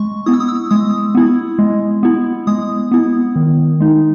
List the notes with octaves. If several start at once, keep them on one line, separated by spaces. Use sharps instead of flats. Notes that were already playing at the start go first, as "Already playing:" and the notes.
Already playing: G#3 C#6
B3 E4 D#6
E6
D#6
E6
G#3 D#6
B3 E4
G#3
B3 E4
G#3 D#6
B3 E4
D#3
G#3 D#4